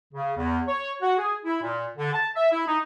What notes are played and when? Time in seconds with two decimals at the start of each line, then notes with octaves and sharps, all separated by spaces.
0.13 C#3
0.37 E2
0.67 C#5
1.02 F#4
1.18 G#4
1.45 E4
1.62 A#2
1.97 D3
2.13 A5
2.36 E5
2.51 E4
2.67 D#4